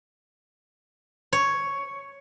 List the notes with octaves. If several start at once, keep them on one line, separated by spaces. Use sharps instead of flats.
C#5